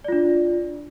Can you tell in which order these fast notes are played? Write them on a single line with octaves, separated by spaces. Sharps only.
D5 F4 D4